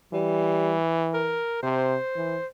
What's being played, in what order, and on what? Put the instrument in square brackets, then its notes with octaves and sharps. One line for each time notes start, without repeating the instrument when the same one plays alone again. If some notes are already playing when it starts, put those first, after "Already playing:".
[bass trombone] E3 [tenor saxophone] G3
[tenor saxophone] A#4
[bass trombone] C3 [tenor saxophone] C5
[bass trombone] E3